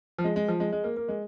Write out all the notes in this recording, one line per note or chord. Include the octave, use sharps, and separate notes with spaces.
F3
G#3
G#3
F3
G#3
G#3
A#3
A#3
G#3